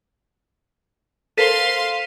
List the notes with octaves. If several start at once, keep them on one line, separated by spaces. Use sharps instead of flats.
A4 A#4 C5 F5 C6 B6 D#7 E7